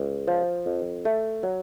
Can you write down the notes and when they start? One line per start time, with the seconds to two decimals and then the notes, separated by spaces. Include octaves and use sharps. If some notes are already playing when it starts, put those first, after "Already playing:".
Already playing: C#2
0.28 F3
0.66 F2
1.05 A3
1.43 F#3